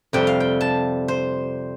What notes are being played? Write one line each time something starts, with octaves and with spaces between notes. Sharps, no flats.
F2 C3 G3 G5
F5
G5
A5
C5